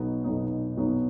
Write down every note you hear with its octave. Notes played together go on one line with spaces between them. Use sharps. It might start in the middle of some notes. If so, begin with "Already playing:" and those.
Already playing: B1 B2 F#3 B3 D#4
B1 B2 F#3 B3 D#4
B1 B2 F#3 B3 D#4